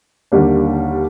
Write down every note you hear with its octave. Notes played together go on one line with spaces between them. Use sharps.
D#2 D3 G3 A#3 D4